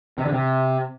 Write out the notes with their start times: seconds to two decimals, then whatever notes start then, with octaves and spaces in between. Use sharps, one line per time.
0.18 C3
0.25 D3
0.32 C3